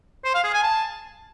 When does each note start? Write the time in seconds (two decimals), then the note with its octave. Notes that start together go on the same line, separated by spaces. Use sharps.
0.25 C5
0.34 F5
0.44 G#4
0.53 G#5
0.63 A5